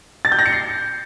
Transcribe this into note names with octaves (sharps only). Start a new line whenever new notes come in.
A6
G6
A#6
C#7
C7